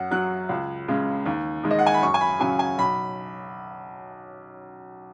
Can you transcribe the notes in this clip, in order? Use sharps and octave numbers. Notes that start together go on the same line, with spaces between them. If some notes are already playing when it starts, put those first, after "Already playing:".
Already playing: F#2 F#5
F#3 F#6
C#2
C#3 G#3
D#2
D#3 G#3
D#5
F#5
G#5
B5
F#2 C#6
G#5
B5
C#3 F#3 G#5
G#5
B1 B5